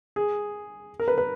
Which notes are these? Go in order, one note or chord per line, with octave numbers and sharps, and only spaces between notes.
G#4
A#4
B4
B4